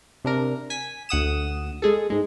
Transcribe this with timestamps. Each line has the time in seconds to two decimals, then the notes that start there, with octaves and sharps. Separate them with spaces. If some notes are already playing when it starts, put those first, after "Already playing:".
0.24 C3 D4 A#4
0.70 G#5 B6
1.09 D2 F#5 D#6 E7
1.82 G#3 G#4 A4
2.10 G#2 G#3